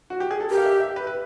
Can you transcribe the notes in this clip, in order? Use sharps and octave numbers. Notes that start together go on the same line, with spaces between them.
F#4
G4
G#4
A4
G4 A#4
F5
E5
E5
B4
B4